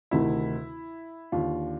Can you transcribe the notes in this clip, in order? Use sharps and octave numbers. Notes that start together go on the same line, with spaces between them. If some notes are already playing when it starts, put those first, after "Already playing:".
D2 C3 D#3 E4
D#2 D3 F4